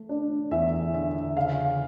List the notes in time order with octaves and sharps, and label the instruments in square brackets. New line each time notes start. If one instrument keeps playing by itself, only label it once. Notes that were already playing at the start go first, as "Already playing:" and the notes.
Already playing: [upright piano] A3
D4
E2 E5
D3 E5
C#3 F5